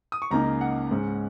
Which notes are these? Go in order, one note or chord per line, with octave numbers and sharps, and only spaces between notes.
D#6
C#6
C#2 C#3 A#3 D#4 A#5
F#5
G#2 G#3 C#4